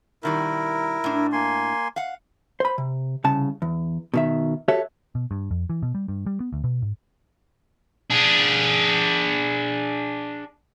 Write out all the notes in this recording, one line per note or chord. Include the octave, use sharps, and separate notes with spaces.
B2 D#3 G3 E4 A#4
A2 D4
A#3 G#5 C6
F5 F#5
C5 B5
C3
C2 C#3 A5
E2
B2 D#3 E5
F#4 G4 A4 C#5 E5
B2
G2
F2
E3
B2
G3
G2
G3
B3
D2
B2
G#2
D4 G#4